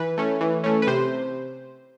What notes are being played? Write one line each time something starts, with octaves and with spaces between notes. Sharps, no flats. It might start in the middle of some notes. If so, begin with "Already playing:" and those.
Already playing: E3 B4
A3 C#4
E3
A3 C#4
B4
C3 C5